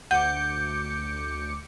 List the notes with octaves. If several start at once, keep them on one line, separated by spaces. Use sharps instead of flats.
D2 F#5 D6 G6 C#7